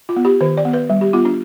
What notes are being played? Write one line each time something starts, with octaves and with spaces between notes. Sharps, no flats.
F4
B3
G4
D#3 C5
D5
B3
B4
G3
G4
B3 F4
D4